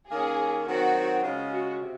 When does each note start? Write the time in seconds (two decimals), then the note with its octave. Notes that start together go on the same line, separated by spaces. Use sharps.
0.10 D#3 A#3 C#4 G#4
0.67 D#3 F#3 C4 F#4
1.23 C#3 G#3 C#4 F4
1.51 F#4
1.81 C3